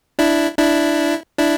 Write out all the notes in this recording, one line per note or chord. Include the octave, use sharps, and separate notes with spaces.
D4 E4
D4 E4
D4 E4